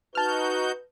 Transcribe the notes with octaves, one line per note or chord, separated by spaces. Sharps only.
D#4 F#4 B4 A5 F6 G6